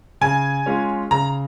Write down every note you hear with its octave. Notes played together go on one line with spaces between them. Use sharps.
C#3 G#5
G#3 C#4 F4
C#3 A#5